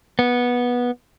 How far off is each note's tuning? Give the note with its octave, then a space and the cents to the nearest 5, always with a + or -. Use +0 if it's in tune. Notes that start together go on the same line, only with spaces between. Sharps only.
B3 -15